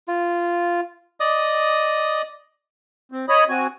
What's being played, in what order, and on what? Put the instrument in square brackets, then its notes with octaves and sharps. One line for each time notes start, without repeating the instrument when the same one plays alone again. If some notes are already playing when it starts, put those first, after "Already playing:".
[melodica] F4
D5 D#5 D#6
[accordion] C4
C#5 D#5 B5 D#6
C4 F#4 G#5